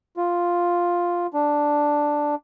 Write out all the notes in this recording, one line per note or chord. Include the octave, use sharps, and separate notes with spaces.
F4
D4